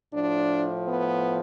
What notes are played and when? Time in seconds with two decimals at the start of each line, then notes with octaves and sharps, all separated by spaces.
0.12 A2 F3 D4
0.87 B3